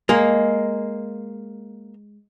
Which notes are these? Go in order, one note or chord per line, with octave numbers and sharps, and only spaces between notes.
G#3 A#3